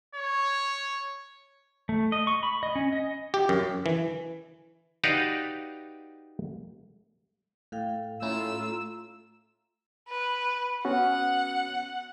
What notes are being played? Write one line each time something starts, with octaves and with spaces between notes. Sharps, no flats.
C#5
A3
D#5
C#6
B5
D#5
C#4
D#5
G4
F#2
E3
D#4 F#4 G4 B4 D5 F5
A2 A4 F5 G5
A2 A3 C#4 E4 F4 A#5 E6
B4
B3 C#4 F#4 F#5